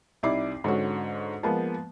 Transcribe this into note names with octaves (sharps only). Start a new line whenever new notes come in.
C2 D#4 E4 D5 D6 C7
G#2 D3 C#4 F#4
F3 G#3 A#3 B3